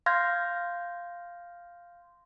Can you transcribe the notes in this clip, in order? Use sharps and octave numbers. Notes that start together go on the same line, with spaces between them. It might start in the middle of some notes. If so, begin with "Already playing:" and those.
F5 C6 F6 G6 G#6 A#6